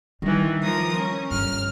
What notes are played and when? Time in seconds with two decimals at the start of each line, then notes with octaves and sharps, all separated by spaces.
0.22 D#3 E3 G3 D4
0.62 F3 A#4 D#6
0.97 C#4
1.31 G1 F6